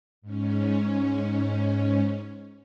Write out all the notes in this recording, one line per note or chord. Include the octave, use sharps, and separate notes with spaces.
G#2 C#4